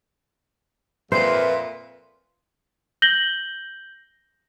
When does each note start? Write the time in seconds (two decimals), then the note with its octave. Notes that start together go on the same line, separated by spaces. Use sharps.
1.12 F2 A#2 B4 C5 E5
3.02 G6 A#6 F#7 G7